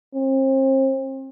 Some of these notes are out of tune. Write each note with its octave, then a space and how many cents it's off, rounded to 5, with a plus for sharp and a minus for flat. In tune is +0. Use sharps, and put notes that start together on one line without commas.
C4 +35